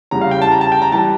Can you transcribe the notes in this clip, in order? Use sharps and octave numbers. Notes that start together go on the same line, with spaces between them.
E2 C#3 G3 A#5
F5
G5
A5
A#5
A5
G5
A#5
E3 G3 A5